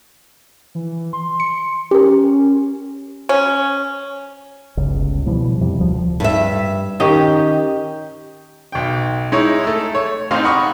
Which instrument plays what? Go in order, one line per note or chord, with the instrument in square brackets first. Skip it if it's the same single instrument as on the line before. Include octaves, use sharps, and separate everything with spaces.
[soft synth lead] E3
C6
[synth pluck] C#7
[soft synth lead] C#4 [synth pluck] G4 A#4
[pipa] C#4
[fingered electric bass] G1 C#2 C#3
B2 E3 F3 G3
F2 C3 E3 G3
D1 D2 E3 F3
[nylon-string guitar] G2 E5
[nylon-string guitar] D#3 [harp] C#4 G4 D#5
[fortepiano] B1 G5
G#3 D#4 E4 C#5
A3 E6
C#5
A1 C4 D#4 F5 C6
F#5 B5 C#6 D#6